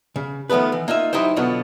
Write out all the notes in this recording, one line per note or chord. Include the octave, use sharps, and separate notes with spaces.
C#3
D#3 F3 A3 B3 B4
E3
A#3 D#4 F4 E5
F#3 D#4 E4 G4 C5
B2 D3 F#3 B3 F4